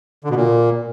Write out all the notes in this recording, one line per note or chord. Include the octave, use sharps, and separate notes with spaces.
D3
B2
A#2